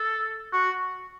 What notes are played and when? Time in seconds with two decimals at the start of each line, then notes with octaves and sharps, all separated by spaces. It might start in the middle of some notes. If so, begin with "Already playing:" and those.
Already playing: A4
0.53 F#4